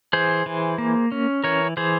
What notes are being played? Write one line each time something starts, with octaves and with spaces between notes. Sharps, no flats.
E3 G#4 C5
E3
A#3
C#4
E3 A#4 C#5
E3 G#4 C5